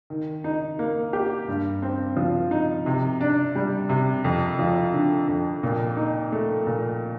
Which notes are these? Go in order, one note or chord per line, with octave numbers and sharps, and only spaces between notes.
D#3
D#4
A#3
G4
G2
C4
F3
D#4
C3
D4
G3
C3
F2
F3
D3
F2
A#2
D#4
A3
A#2